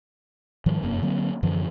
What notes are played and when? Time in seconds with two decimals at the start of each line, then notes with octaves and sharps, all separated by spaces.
0.66 G#2 D#3 F3 G3
0.83 F1 F#2 A#3
1.02 D3 F#3 A#3 C4
1.43 F#2 D3 E3 F3